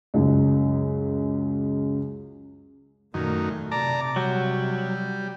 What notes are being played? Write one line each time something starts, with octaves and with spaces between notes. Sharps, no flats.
C#2 F#2
F#2 A#2 D#3 A3
C3 D5 A5 A#5
F#3 G3